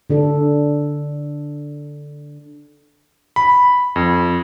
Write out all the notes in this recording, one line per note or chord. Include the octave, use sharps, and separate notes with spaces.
D3 D4 A4
B5
F2